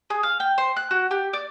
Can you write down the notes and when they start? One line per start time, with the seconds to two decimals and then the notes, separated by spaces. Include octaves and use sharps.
0.10 G#4
0.23 F5
0.40 G5
0.58 C5
0.77 F#6
0.91 F#4
1.11 G4
1.33 D5